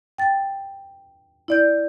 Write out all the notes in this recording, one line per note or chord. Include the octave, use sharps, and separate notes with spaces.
G5 A6
E4 D5 G6